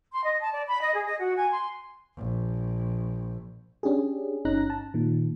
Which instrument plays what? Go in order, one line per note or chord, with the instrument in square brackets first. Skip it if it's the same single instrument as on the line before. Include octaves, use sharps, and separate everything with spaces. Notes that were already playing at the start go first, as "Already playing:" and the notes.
[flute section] C6
D#5
A5
D5
B5
D#5
G#4
D#5
F#4
G#5
C6
[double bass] A#1
[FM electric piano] C#4 D4 G4 G#4
G1 C#4 D#4 A#5 F#6 A#6
A5
A#2 D#3